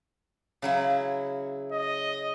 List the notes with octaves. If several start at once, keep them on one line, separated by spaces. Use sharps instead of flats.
C#3 F#3 E4
D#5